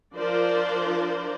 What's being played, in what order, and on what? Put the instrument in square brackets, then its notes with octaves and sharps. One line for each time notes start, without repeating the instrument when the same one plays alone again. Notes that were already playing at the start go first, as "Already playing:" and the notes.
[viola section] F3 D4 F4 A#4 C5 D5